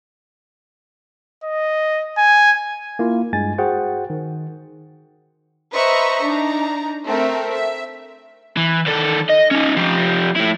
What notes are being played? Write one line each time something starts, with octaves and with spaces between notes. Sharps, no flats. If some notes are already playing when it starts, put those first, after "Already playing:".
D#5
G#5
A#3 E4 F4
G2 G#3 G#5 A6
F#4 G#4 C5 F#5 G5
D#3
B4 C5 D#5 E5 A#5 C#6
D4 D#4 A#5
A3 C4 A#4 E5
E5
E3
D#3 A4
D#5
C#4 D#4
F3 G4
A3 E4